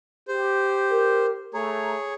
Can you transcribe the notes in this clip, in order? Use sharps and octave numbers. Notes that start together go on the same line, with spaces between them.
G4 C5
A#4
A3 G#4 C#5 A#5